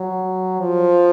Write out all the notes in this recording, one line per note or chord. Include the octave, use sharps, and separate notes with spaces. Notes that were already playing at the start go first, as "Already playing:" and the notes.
Already playing: F#3
F3